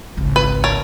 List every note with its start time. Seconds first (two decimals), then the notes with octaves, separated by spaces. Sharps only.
0.17 G#1 C#2
0.36 B4
0.64 A#4 C#5 A5